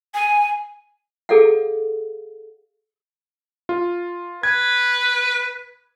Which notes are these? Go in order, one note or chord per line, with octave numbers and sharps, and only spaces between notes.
G#5
G#4 A4 D5 F5 F#5
F4
B4 G#6